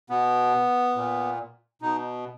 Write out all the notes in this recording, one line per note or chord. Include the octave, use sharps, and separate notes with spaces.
B2 B3
A#2
B2 D#4